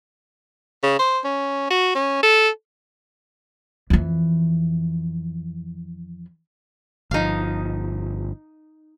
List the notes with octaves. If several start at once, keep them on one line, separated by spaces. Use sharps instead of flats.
C#3
C5
C#4
F#4
C#4
A4
F2 E3
G1 F3 D#4 F5